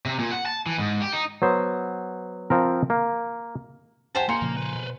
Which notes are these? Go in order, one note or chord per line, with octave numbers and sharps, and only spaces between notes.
C3
A#2
F#5
A5
E3
G#2
G4
D#4
F#3 B3 C5
F3 C4 A#4
A#3
G4 C5 F#5 G#5 A5
A#3 D#4 G#5 C6 C#7
A#2 C#3 F3
B4 C5
B2